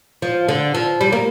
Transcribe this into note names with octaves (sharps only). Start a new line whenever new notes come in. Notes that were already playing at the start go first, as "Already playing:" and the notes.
F3
D3
F3
G3
A#3